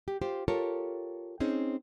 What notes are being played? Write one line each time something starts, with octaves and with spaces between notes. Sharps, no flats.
G4
F4 G4 C5
F4 G4 A4 A#4 C#5
C4 C#4 D#4 G#4